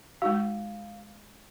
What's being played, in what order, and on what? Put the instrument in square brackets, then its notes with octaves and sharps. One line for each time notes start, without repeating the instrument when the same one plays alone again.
[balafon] G#3 D#4 F#4 [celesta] F5